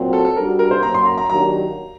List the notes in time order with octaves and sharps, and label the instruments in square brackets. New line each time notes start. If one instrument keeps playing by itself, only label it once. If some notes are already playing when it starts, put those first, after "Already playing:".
Already playing: [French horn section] A#2 F#3 C4 F#4 C5
[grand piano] A4
A4
[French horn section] G3 D4 F#4 [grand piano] A#4
[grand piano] A#4
C5
[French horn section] F#2 F#3 A#3 [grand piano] A#5
[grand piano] C6
A#5
A#5
[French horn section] D#3 F#3 A#3 D4 G4 [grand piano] A#5